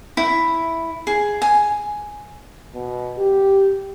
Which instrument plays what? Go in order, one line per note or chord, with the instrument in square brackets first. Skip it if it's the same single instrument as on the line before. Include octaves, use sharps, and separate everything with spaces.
[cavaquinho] E4
G#4
G#5
[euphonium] B2
G4